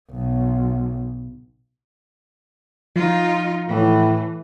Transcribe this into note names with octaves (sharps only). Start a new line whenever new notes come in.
B1
F3 D#4 F4
A2 E3